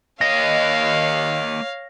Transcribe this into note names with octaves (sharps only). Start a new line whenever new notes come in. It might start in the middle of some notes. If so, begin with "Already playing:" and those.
A#3 C#5 D#5 F5 A#6